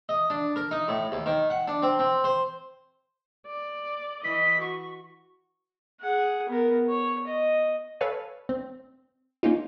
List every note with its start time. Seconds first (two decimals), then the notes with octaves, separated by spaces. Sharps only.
0.09 D#5
0.30 D4
0.56 A#4
0.71 D#4
0.88 A2
1.12 D#2
1.26 D#3
1.50 F#5
1.68 D4
1.82 C4
1.99 C4
2.24 C5
3.47 D5
4.24 E3 D#5 B6
4.61 F#4 C#6
6.01 G#4 F#5
6.49 B3 A#4
6.89 C#5
7.27 D#5
8.01 A4 B4 C#5 F5 G#5
8.49 C4
9.43 A#3 C#4 D#4 F4